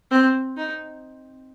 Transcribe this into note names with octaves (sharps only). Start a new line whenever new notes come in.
C4
D#4